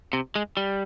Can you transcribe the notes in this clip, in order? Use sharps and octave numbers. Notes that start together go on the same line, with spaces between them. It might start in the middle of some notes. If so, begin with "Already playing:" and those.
C3
G#3
G3